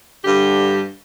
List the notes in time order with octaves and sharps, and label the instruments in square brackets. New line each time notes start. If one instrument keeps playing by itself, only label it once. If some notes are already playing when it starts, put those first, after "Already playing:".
[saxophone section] G2 D3 G4